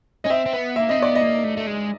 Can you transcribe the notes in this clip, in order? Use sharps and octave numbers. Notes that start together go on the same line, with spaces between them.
C#4 D#5
C4 E5
C4
B3
A#3 E5
C4 D#5
B3 D5
D#5
A#3
A3
A3
G#3